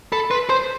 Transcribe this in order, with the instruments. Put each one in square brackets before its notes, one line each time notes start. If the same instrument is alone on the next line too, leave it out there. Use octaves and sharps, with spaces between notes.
[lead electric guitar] A4 [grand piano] B5
[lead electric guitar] B4 [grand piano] C6
[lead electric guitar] C5 [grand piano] C6